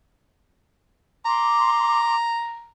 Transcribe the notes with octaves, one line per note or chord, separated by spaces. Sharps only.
A#5 C6 D6